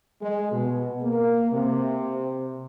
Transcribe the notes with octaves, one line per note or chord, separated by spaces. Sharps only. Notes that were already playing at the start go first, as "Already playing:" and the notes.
G#3
B2
A#3
C3